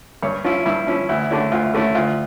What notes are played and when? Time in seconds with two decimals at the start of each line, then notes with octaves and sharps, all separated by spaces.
0.23 G2 C#5
0.44 F3 C#4 E4 F4
0.66 G2 E4
0.87 F3 C#4 E4
1.09 D2 E4
1.30 D3 A3 C#4 E4
1.52 D2 F4
1.74 D3 A3 C#4 E4
1.95 D2 F4